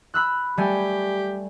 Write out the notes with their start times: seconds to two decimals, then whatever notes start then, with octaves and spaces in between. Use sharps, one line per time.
0.14 B5 E6 F#6
0.57 G3 A3 G4 G#5